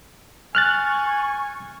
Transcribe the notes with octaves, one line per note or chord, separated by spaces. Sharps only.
G#5 C#6 F6 F#6 A6